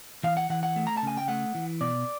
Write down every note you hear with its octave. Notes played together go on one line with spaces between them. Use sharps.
E3 F5
F#5
E3 F#5
F#5
A3
A#5
A5
C#3 G#5
G5
A3 F#5
E3
B2 D5